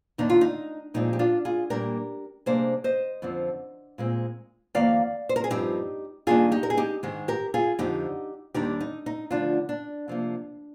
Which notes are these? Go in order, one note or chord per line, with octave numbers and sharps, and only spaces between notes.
D#2 D#3 A#3 D4 D#4
F4
D#4
A#2 F3 G#3 C4 D#4
G4
D4 F4
F4 G#4
A#2 G3 A#3 D4 G4 A#4
C3 G3 A#3 D4 G#4 C5
C5 D#5
F2 D3 F3 C4
A#2 G#3 C4
F2 D#3 A#3 D5 F5
C5
A#4
G#4
G2 F3 C4 D#4 G4
G2 D#3 A#3 D4 F4 G#4
D#4 G4
A#4
G#4
D#4 G4
G#2 D#3 G#3
G4 A#4
F4 G#4
F2 D3 F3 D#4 G4
D#2 D#3 G3 D4 D#4 G4
D#4
D#4
D2 D3 F3 D4 F4
D4
C3 F3 A#3